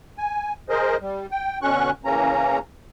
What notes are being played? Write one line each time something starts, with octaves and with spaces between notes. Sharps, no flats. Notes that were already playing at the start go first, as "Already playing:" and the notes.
G#5
G#4 A#4 C5 D#5
G3
G5
B2 D3 C#4 C#6 F#6
C#3 E3 A#3 C#4 A#5